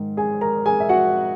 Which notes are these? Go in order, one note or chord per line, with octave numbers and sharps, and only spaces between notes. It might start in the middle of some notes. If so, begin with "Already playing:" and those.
Already playing: G#2 D#3
G#4 G#5
A#4 A#5
G#4 G#5
E5
F#4 F#5